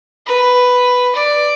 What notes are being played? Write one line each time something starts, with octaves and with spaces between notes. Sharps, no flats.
B4
D5